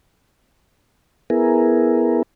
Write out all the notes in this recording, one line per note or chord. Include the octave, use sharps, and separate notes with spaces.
B3 E4 G#4 A#4